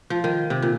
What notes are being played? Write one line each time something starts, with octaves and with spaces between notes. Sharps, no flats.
F3
D#3
C3
A#2